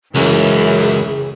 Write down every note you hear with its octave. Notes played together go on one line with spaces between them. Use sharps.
C#2 F#2 E3 G#4